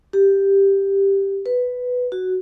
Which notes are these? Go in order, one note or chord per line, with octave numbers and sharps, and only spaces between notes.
G4
B4
F#4